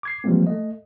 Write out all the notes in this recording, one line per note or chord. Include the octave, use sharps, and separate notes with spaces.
D6 G#6 C7
E3 F3 G3 G#3 A#3 C4
A3 D#5